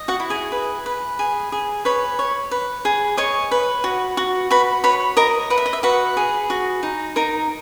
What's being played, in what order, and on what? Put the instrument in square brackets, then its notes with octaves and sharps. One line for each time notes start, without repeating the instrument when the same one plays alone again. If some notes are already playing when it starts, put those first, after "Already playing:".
Already playing: [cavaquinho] D#5
F#4 F#5
E4
G#4 G#5
B4
B4
G#4
G#4
B4 C#5 B5
C#5
B4
G#4
C#5 D#5 C#6
B4
F#4
F#4
F#4 B4 B5
B4 C#5 B5
A#4 D#5 A#5
B4 F#5
E5
D#5
E5
F#4 B4 F#5
G#4
F#4
D#4
D#4 A#4 A#5